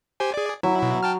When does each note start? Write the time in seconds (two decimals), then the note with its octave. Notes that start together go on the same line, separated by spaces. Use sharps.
0.20 G4 C5 G#5
0.34 G#4 D5
0.63 F#3 E4
0.79 B2 E4
1.03 G5 A5 F6